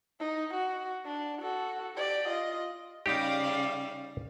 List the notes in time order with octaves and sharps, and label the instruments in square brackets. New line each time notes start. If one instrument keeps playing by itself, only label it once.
[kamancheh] D#4
F#4
D4
F#4 A4
G4 D5
F4 D#5
[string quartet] C#3 G3 F5 [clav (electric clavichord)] D#4 G4